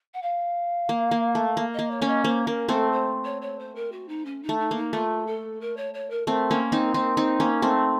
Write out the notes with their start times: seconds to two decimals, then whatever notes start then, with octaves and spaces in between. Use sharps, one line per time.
0.14 F#5
0.22 F5
0.89 A#3
1.11 A#3
1.35 A3
1.57 A#3
1.74 A#3 D#5
1.91 C#5
2.02 A#3 C#4
2.08 D#5
2.24 A#3 C5
2.46 A#3 A#4
2.69 A3 C4 A4
2.92 C5
3.24 C#5
3.41 C#5
3.59 C5
3.75 A#4
3.92 F#4
4.08 D#4
4.25 C#4
4.43 D#4
4.49 A3
4.60 D#4
4.71 A#3
4.76 D#4
4.93 A3 F4
5.27 A4
5.61 A#4
5.77 C#5
5.94 C#5
6.10 A#4
6.27 A3 C4 A#4
6.51 A#3 C#4
6.72 C4 D#4
6.94 C4 D#4
7.17 C4 D#4
7.40 A#3 C#4
7.62 A3 C4